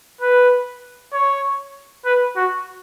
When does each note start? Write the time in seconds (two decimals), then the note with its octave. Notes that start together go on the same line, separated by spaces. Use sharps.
0.21 B4
1.13 C#5
2.05 B4
2.36 F#4